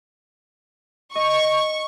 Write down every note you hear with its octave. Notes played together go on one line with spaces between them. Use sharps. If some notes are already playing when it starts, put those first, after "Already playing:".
D#5 C#6